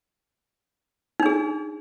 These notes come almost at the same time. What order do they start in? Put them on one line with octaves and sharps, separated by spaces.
D#4 D4 G#4